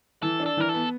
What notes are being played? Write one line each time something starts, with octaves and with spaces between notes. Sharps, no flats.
E3 A4
D4
A4
E3 A#4
A4
B3